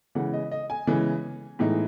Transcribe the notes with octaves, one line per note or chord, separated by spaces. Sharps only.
C#3 E3 G#3 F#5
D#5
D#5
G#5
C#3 E3 G#3
A2 E3 G#3 D#4